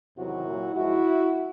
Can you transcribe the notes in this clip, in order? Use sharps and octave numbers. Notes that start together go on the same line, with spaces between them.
E2 C3 D#3 F#3 E4 F#4
A#2 F#3
G#2 F3 G#3 E4 F#4